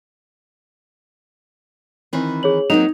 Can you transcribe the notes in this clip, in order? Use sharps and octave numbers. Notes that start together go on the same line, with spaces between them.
D#3 E3 C4
G#4 C#5 F#7
F#3 A#3 C4 D#4 F7